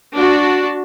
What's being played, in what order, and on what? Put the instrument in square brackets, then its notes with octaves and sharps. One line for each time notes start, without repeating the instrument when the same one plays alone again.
[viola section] D4 F#4